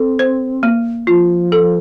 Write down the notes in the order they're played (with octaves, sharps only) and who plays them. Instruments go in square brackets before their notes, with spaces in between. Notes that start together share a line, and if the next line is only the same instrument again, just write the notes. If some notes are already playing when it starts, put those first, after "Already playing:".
Already playing: [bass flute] C4 [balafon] A4
[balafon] C5
A#3
[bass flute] F3 [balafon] F4
[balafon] A4